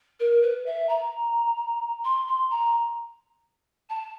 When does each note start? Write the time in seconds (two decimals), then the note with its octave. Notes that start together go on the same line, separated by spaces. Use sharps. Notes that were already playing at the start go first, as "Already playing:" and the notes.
0.20 A#4
0.42 B4
0.66 E5
0.89 A#5
2.04 C6
2.27 C6
2.50 A#5
3.89 A5